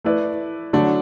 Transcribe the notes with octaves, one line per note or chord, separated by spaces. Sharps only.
A3 E4 B4 D5
D3 F#3 A3 D4